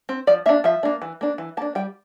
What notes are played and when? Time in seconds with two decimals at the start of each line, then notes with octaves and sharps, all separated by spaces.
0.09 C4
0.27 F3 D5
0.46 A#3 E5
0.49 D4
0.64 F3 E5
0.83 A#3 D4
1.02 E3
1.21 A#3 D4
1.38 E3
1.57 A#3 A5
1.62 D4
1.75 G3 G5